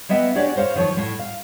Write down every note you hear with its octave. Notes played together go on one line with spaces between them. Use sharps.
A#3 B3 D#5 E5 G5
C#4 D4 F#4 G4 C#5 D5
A#4 C5 C#5 F5
D#3 F3 C#5
A2 A3
F5